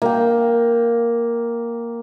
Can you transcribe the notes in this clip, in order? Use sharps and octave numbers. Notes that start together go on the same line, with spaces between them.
A#3 G5